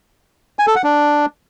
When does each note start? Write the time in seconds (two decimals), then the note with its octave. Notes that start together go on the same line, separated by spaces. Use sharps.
0.59 G#5
0.67 A4
0.76 F#5
0.84 D4